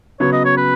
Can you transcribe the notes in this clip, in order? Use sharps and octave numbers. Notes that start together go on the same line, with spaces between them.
C#3 F#3 B3 C#5
D#5
C#5
B4